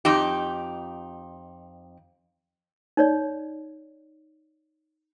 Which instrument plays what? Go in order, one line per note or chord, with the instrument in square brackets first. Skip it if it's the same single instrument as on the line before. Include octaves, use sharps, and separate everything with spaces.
[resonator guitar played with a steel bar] F2 D#4 G4
[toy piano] D#4 C#5 D5